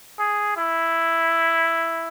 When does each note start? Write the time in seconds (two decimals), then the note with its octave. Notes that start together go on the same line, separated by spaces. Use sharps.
0.19 G#4
0.57 E4